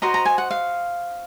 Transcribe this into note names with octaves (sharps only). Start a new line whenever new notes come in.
F#4 C5 D#5 A#5
A#5
G#5
F#5
F5